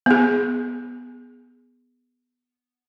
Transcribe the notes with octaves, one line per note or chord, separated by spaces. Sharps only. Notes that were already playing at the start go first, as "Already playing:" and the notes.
B3 G#4